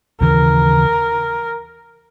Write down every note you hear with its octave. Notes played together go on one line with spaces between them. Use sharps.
D#2 C#3 E3 A#4